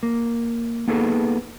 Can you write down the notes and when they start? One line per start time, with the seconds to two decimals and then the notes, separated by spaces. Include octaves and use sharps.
0.03 A#3
0.88 A#3 B3 D#4 G#4 A4